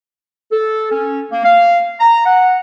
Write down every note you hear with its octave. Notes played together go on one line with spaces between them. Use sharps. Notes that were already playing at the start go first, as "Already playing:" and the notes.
A4
C#4
A#3
F5
A#5
F#5